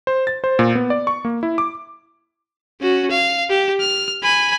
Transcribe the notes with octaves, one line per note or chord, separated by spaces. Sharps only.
C5
A6
C5
A#2
B3
D5
C#6
A#3
E4
D6
C#4 F#4
F5
G4
F6
G#5 B5